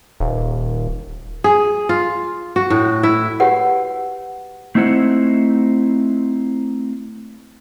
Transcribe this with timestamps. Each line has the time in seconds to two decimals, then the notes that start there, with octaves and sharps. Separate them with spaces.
0.20 D#1
1.44 G#4
1.89 F4
2.56 F#4
2.70 A2
3.03 E4
3.40 F#4 G4 B4 C#5 F#5
4.75 A3 C4 D#4 E4 C5 F#5